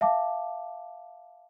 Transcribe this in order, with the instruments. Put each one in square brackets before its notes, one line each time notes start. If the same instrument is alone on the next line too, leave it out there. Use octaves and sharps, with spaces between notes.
[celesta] E5 F5 A5 D6